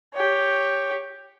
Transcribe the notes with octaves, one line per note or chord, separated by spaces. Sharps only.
G4 C#5